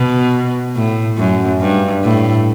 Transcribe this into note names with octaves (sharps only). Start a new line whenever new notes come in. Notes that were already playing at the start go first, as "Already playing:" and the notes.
Already playing: B2
A2
F#2
G2
A2